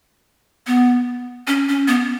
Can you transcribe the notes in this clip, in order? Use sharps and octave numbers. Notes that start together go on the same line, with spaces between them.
B3
C#4
C#4
B3